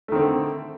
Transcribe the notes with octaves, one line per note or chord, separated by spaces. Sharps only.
D3 D#3 A3 C4